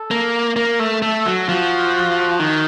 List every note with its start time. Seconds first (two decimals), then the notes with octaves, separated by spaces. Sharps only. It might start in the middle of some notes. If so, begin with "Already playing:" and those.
Already playing: A4
0.11 A#3
0.56 A#3 A#4
0.79 A3
1.02 A3 A4
1.25 F#3
1.48 F3 F#4
2.39 D#3